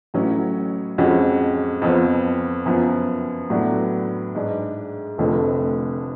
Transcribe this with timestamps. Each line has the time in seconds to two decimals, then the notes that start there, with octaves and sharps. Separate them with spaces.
0.14 A1 A2 F#3 C#4
0.98 F2 F3 G#3 C#4 F#4
1.82 F2 F3 B3
2.66 F#2 F3 B3
3.50 A2 F#3 B3 D4 F#4
4.35 G#2 G#3 D4
5.18 F1 F2 D3 F3 A3